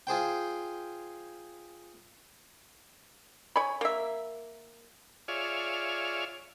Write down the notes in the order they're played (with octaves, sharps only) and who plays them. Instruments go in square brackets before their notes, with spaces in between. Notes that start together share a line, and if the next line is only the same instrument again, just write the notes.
[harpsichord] F4 G#4 C5 G5
[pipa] C#5 G#5 B5
A#3 E5
[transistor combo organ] F4 G#4 C#5 D5 E5 F6